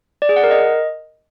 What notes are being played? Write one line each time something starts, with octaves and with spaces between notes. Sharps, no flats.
D5
G#4
F#5
A#4
D#5